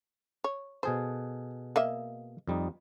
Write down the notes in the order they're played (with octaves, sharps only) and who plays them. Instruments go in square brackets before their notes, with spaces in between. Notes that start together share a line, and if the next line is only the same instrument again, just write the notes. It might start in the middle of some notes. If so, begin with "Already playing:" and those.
[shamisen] C#5
[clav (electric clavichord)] B2 G#4 A4 [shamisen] C5
[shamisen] A#3 D#5 E5
[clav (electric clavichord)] F2 G3 D#4